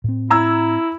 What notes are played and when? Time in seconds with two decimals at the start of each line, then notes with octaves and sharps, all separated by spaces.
0.04 A2 C4
0.30 E4 A#5 E6 G#6